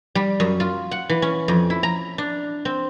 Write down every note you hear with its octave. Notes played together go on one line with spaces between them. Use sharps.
G3
F#2
F4
F#5
E3
C#4
F2
E4
A#5
D4
C4